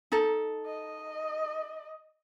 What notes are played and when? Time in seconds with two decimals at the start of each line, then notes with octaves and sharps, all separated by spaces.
0.12 D#4 A4
0.66 D#5